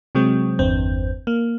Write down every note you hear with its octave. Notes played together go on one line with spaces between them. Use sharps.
C3 F#3 G#3 C4
G1 E2 C4
A#3